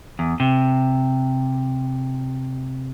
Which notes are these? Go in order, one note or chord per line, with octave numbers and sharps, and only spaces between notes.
E2
C3